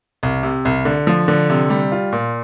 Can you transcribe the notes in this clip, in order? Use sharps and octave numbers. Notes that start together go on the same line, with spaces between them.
C2
C3
C2
D3
F3
D3
C3
G3
F4
A#2